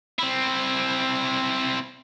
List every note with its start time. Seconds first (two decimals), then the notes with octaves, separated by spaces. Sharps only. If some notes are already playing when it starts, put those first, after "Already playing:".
0.19 C4 E4